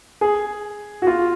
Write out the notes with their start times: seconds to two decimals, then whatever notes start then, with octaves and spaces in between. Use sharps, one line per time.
0.21 G#4
1.02 F#4
1.07 F4